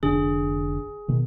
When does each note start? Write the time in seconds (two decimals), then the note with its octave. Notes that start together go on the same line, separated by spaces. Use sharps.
0.03 F1 D3 D4 G#4
1.08 B2 D#3 A#3